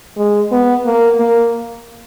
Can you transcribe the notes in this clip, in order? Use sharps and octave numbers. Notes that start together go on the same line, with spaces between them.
G#3
B3
A#3
A#3